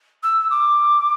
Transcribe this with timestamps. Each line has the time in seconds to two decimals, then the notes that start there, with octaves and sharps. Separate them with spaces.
0.23 E6
0.50 D6